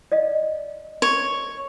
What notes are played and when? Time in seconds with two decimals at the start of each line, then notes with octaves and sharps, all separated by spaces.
0.12 D5 D#5 F5
1.02 C#5